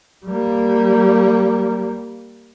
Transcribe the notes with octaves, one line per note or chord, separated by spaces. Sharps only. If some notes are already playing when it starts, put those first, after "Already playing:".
G3 A#3